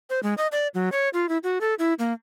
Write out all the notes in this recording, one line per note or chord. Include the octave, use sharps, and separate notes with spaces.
C5
G#3
D#5
D5
F#3
C#5
F4
E4
F#4
A4
E4
A#3